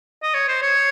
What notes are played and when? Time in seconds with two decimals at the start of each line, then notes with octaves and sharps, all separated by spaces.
0.23 D#5
0.34 C#5
0.48 C5
0.62 C#5